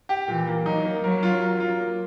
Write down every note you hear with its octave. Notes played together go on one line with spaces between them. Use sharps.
G4
A#2 E3
A#3
F#3 D#4
A#3
F#3 A#4
F4
A#4
F4
A#3